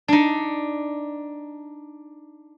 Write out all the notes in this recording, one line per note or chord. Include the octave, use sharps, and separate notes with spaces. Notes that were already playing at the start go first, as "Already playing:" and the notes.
D4 D#4